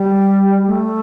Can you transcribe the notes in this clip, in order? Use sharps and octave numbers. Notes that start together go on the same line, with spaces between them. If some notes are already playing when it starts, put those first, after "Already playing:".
Already playing: G3
A3